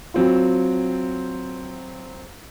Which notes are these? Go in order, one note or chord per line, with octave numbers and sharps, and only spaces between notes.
F#3 C4 F4